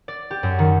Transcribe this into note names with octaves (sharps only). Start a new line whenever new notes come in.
D5
G4
F#2
D#3